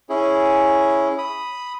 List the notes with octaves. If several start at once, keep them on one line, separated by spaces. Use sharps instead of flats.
C#4 E4 G#4
B5 D#6